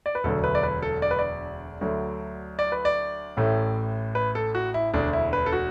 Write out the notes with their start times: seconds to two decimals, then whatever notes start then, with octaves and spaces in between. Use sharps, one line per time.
0.06 D5
0.15 B4
0.24 E1 D2 D3 F#3 A3 A4
0.44 B4
0.55 D5
0.63 B4
0.82 A4
1.02 D5
1.11 B4
1.19 D5
1.81 D2 D3 F#3 A3
2.59 D5
2.72 B4
2.85 D5
3.37 A1 A2 A3
4.15 B4
4.35 A4
4.55 F#4
4.74 E4
4.93 E1 D2 D3 D4
5.13 E4
5.33 B4
5.46 A4
5.52 F#4